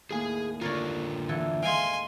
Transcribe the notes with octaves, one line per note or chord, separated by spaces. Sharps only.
D#2 A2 G#4 G#5
D3 F4 A#4 C#5 D5
E3 A4 G#5
G#3 F5 G#5 C6